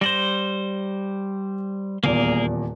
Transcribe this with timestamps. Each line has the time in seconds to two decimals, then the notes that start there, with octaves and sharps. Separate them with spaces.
0.01 G3 C5 A#6 E7 F#7
2.04 D#1 E2 A#3 G#4 A#4 D5